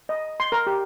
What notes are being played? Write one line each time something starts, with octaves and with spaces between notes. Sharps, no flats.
D#5
C6
A#4
G4